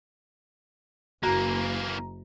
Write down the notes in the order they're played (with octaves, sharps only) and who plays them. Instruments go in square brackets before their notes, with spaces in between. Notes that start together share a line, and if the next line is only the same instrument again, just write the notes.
[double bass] F#1 [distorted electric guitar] E3 A#3 [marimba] F#4 [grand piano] A#5